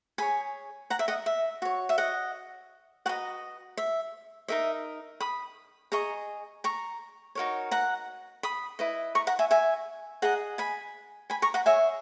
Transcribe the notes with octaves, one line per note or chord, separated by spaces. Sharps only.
G#4 C#5 G#5 B5
F#5 A#5
E5
D#5 F#5
E5
F#4 C#5
E5
D#5 F#5
F#4 B4 D#5 F#5 A#5
E5
D#4 A#4 D#5 E5
B5 D#6
G#4 D#5 A#5 C#6
A#5 C#6
D#4 F#4 A#4 C#5
F#5 A#5
B5 D#6
E4 B4 D#5
A#5 C#6
F#5 A#5
E5 G#5
E5 G#5
G#4 D#5 F#5 A#5
G#5 B5
G#5 B5
A#5 C#6
F#5 A#5
G#4 C#5 E5 G#5